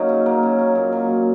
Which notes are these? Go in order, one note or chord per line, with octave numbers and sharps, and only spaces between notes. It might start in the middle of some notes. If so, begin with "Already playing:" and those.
Already playing: F#3 A#3 C#4 D#4
C#3
F#3 A#3
C#3
F#3
A#2
F#3
A#2